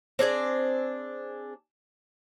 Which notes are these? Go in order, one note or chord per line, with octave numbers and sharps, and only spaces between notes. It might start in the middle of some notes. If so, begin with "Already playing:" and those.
C4 D4 G#4 D5